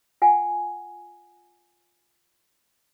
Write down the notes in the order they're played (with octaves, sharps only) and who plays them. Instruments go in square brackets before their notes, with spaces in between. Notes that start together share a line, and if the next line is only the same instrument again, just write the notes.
[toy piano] F4 F#5 G#5